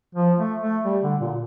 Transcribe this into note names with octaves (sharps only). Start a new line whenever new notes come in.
F3
A3
A3
G3
D3
A#2